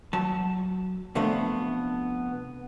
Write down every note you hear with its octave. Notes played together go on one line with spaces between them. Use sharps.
F#3 A5
C3 F3 A3 B3 D4